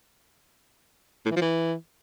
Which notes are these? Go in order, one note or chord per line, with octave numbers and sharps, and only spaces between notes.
A2
E3
F3
E3